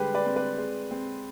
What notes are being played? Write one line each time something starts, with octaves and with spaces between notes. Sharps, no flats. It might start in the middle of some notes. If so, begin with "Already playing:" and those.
Already playing: D3 G3 G#3 G4 B4
B4 D5
C4
B4 D5
G#3
C4